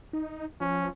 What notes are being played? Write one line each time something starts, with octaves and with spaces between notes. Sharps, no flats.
D#4
F3 C#4